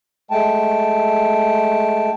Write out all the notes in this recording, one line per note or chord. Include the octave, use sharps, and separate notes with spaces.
G#3 A3 G5 A5